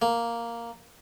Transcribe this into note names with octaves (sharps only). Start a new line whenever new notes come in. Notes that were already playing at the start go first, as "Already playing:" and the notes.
A#3